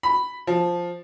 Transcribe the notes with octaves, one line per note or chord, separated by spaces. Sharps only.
B5
F3